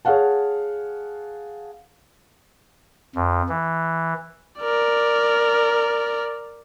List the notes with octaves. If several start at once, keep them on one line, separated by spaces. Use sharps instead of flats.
G#4 C#5 F5 F#5 A5
F2
E3
A#4 D5